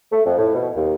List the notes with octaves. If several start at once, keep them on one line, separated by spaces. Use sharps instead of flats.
A3
F2
A2
B2
D#2